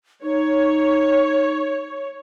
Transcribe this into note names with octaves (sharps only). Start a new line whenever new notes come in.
D#4 C#5